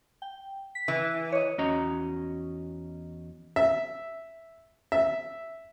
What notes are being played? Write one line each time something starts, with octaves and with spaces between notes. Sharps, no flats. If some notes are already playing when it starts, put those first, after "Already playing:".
G5
B6
E3
C#5 D#5
E2 C#4 F#4 D#5 A#5
E5
E5